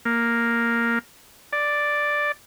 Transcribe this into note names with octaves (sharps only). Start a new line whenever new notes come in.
A#3
D5